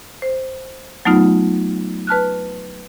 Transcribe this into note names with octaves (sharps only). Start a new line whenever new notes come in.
C5
F#3 A3 B3 D#4 F4
B4 A5 F6 F#6